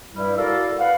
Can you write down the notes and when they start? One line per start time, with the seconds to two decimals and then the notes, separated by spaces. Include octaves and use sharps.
0.13 G2 G3 E4
0.36 E4 F#4 A4 A#4 D5 F5
0.78 B4 F5 F#5